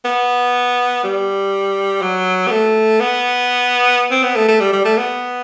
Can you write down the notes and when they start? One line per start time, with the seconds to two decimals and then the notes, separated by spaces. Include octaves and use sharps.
0.05 B3
1.04 G3
2.02 F#3
2.47 B3
2.51 A3
3.00 B3
4.11 C4
4.23 B3
4.36 A3
4.48 A3
4.60 G3
4.73 G3
4.85 A3
4.98 B3